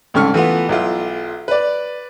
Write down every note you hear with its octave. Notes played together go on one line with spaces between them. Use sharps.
C2 G#2 C#3 A4 C#6 F6
E3 A3 B3 F4
B1 E4 F4
B4 D5